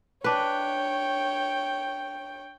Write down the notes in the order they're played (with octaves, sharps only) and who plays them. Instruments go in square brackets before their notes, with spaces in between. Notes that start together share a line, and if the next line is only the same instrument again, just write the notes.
[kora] D4 B4 [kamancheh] C#5 G5